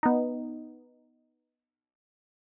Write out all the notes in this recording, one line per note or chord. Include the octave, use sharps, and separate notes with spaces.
B3 D#4